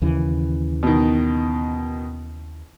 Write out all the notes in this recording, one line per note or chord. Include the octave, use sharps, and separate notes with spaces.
D#2 C#3 E3
B2 D#3